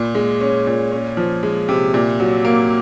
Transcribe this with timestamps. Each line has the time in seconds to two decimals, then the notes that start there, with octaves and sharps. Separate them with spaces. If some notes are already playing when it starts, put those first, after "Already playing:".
Already playing: A#2
0.15 G#3
0.41 C#4
0.67 A#2
0.92 C#4
1.17 F3
1.43 G#3
1.69 C3
1.94 A#2
2.20 F#3
2.45 A#3